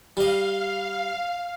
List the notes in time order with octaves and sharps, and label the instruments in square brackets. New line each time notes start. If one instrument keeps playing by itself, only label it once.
[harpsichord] G3 D#5 [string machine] F5